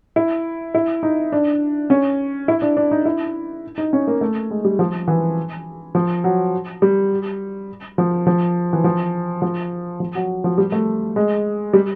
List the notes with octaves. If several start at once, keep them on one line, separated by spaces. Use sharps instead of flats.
E4
E4
D#4
D4
C#4
E4
D4
D4
D#4
E4
D#4
C#4
A#3
A3
G#3
G3
F3
E3
F3
F#3
G3
F3
F3
E3
F3
F3
F3
F#3
F3
G3
A3
G#3
G3